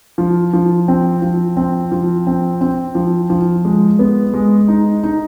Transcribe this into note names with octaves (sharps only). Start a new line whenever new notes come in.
F3
F3
C4
F3
C4
F3
C4
C4
F3
F3
G#3
B3
G#3
D#4
D#4